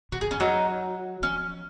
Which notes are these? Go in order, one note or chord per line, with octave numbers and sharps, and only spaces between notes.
C3 F#4
F#2 G#4
F3 C#4
F#3 D#4
F3 C#4